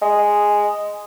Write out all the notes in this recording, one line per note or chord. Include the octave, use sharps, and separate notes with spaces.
G#3